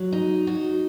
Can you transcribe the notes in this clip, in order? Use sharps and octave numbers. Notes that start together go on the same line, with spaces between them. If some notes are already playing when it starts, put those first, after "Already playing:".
Already playing: F#3
D#4
F#4